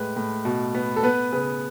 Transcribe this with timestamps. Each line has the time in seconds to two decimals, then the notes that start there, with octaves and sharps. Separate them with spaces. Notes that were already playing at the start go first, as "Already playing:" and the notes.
Already playing: A2 G#3 B4
0.16 A2
0.45 B2
0.75 B3
0.96 A4
1.03 B3 B4
1.32 C#3 B4